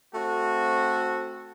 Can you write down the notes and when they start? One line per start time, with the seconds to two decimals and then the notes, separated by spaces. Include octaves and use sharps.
0.14 A3 C4 F#4